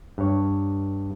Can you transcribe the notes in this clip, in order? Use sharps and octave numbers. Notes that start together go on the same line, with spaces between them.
G2 C#5